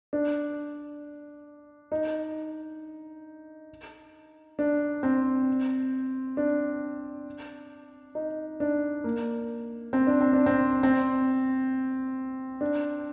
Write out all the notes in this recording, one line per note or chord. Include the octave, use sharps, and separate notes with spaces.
D4
D#4
D4
C4
D4
D#4
D4
A#3
C4
D4
C4
D4
C4
C4
D4